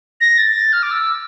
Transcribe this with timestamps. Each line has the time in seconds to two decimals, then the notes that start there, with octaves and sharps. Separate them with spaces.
0.21 A#6
0.38 A6
0.56 A6
0.73 F6
0.83 D6
0.91 E6